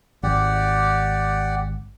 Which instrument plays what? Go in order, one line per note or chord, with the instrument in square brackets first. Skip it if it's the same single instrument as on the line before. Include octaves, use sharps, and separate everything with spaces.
[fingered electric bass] G#1 [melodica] G4 D5 F#5